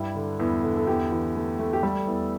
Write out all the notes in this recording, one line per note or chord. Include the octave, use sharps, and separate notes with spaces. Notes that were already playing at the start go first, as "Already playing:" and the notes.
Already playing: G2 G3 E4
D3
E2
D3
A4
E2 G4
E3
A3
A3
G4
G3 A4
E2